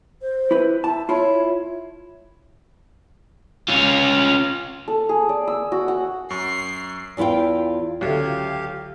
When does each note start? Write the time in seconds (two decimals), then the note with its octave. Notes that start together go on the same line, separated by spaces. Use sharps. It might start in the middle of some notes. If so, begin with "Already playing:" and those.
0.22 C5
0.51 E4 B4
0.84 E4 A5
1.09 E4 F4 C#5
3.68 C#4 F4
4.88 A4
5.09 G#4
5.29 D5
5.48 E6
5.72 F#4
5.88 F#5
6.30 F#2 C#6 C7
7.17 E2 E4 F4 F5 G5
8.01 C#2 D3 F#3 G4 A4 E5 F5